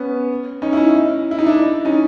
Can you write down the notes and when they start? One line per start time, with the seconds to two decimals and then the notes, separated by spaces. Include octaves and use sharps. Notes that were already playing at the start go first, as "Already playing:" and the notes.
Already playing: B3 C#4
0.62 C#4 D#4
0.73 E4
0.77 C#4 D#4
1.31 E4
1.39 D#4
1.46 D4 E4
1.85 C#4 D#4